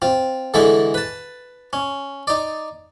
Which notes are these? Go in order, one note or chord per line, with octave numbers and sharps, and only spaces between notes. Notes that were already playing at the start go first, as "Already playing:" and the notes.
C4 F4
D3 E3 G#3 A3 E4 A4
B4 A5
C#4
D#4 D5